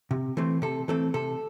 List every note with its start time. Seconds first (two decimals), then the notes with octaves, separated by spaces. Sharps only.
0.11 C3
0.37 E3 A3 C4
0.62 C3 A4
0.88 E3 A3 C4 A4
1.14 C3 A4